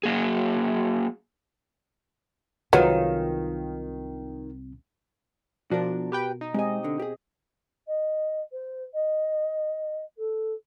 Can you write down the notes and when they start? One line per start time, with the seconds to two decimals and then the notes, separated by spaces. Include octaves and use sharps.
0.03 F#3 A#3 G#4
2.73 C2 C3 D#3 F#3 F4 G#4 B4 C#5
5.71 B2 F3 D4 F#4 A#4
6.12 G4 B4 G5
6.41 D#4
6.54 G#3 C4 G4 D#5 G#5
6.84 D3
6.99 G4 G#4
7.87 D#5
8.52 C5
8.93 D#5
10.17 A4